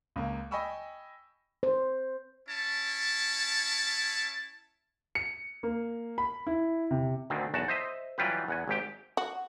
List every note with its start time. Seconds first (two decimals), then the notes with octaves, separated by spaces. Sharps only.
0.16 C#2 A#3
0.51 D#5 G5 G#5 B5 C#6 E6
1.63 C5
2.47 C#4 E4 A5
5.15 C#7
5.63 A#3
6.18 B5
6.47 E4
6.91 C3
7.30 D2 D3 D#3 C4
7.54 B1 E2 F#4 A5
7.68 C5 D#5 E5
8.18 E3 F#3 G3 F4 G4 B4
8.48 E2 F#5 G#5
8.68 G#1 G#2 G4 G5
9.17 F#4